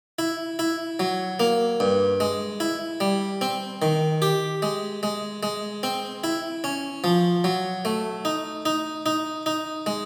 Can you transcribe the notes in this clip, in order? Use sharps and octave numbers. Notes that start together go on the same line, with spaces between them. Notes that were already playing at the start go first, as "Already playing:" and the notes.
E4
E4
F#3
A#3
G2
G#3
E4
G3
C4
D#3
G4
G#3
G#3
G#3
C4
E4
C#4
F3
F#3
A3
D#4
D#4
D#4
D#4
G#3